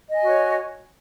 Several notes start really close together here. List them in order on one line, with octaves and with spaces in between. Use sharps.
D#5 G#5 F#4 C#5